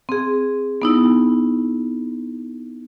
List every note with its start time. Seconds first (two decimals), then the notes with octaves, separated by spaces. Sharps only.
0.09 C4 G#4
0.82 B3 D#4 E4